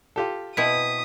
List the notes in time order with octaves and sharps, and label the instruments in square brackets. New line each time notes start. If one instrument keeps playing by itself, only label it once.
[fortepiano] F4 G4 A4
[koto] B2 C4 E4 [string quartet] D#6 [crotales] B6